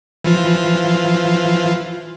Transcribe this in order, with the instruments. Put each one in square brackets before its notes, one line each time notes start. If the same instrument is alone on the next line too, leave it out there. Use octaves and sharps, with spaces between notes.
[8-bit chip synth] E3 F3 F4